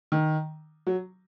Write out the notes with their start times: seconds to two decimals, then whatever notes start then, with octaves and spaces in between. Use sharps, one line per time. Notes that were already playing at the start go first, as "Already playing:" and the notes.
0.12 D#3
0.87 F#3